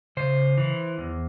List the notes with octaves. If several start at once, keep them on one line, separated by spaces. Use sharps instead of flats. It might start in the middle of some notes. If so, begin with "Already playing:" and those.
C#3 C5
E3
E2